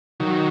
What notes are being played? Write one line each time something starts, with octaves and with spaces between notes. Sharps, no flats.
D#3 F#3